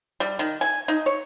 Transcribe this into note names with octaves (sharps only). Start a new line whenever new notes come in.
G3
D#3
G#5
D#4
C#5